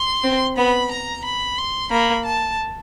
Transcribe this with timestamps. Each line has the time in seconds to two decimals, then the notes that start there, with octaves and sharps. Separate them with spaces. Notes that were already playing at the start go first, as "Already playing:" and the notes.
Already playing: C6
0.24 C4
0.57 B3 B5
0.91 A#5
1.25 B5
1.58 C6
1.91 A#3 B5
2.25 A5